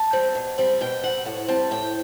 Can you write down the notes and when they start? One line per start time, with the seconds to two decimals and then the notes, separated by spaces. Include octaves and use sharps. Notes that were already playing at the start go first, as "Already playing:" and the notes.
Already playing: A5
0.13 G3 C4
0.35 B2
0.58 G3 C4
0.81 B2 G5
1.04 G3 C4 F#5
1.25 A2 F#5
1.48 G3 C4 A5
1.71 A2 G5